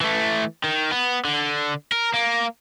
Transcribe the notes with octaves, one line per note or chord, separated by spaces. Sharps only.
E3 A3
D#3
B3
D3
A#4
A#3